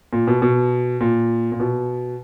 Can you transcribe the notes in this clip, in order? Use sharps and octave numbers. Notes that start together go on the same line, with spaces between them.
A#2
B2
B2
A#2
A#2
B2